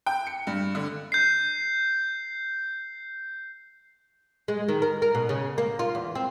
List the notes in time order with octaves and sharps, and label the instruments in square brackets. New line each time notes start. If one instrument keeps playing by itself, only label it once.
[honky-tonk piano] G5
C#7
G2
D3
[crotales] G6 C7
[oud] G#3
D#3
A#4
A#4
B2
C#3
A#3
F4
E2
C4